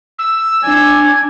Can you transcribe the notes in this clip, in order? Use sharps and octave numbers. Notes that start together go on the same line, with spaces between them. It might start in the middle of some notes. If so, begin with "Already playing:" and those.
E6
D4 G#5